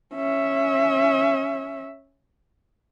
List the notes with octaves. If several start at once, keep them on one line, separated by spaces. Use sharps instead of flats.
C#4 E5